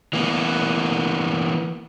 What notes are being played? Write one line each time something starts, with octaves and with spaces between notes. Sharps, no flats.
E3 A#3 B3